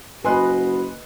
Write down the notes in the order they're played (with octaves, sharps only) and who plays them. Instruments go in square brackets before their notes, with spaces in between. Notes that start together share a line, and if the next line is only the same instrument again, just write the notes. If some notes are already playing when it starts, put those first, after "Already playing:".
[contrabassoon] F#1 [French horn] F#4 [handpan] B4 D#5 [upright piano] G#5 C6 F#6